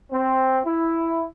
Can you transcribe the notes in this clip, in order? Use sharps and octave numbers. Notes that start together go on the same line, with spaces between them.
C4
E4